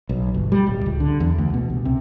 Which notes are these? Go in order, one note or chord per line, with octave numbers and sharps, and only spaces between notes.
B1
G1
G3
D1
C#2
D3
E2
D2
B2
C2
C3